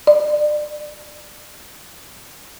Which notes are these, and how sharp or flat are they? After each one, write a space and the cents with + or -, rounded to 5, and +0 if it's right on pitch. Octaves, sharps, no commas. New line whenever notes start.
D5 +25